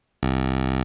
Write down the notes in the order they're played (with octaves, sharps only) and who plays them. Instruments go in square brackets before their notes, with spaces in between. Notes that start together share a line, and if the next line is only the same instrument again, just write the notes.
[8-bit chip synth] C2